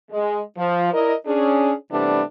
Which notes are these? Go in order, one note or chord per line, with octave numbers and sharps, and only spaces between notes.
G#3
F3
E4 A#4 D5 D#5
C#4 D4 G#4
C3 E3 G3 A3 B3 D4